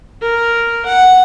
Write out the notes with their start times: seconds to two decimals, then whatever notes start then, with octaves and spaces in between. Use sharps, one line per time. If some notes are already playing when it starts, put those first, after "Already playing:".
0.22 A#4
0.86 F#5